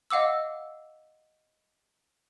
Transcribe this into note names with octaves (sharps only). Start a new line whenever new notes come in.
D#5 F5 F#5 D6 E6